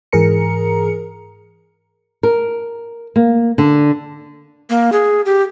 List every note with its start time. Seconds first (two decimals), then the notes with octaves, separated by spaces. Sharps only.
0.12 G#2 E3 G#4 A#4 A#5 C#7
2.23 A#4
3.16 A#3
3.58 D3
4.70 A#3
4.92 G#4
5.26 G4